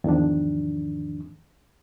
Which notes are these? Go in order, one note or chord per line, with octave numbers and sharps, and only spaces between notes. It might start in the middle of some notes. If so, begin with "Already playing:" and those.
E2 G#2 D#3 F3 D4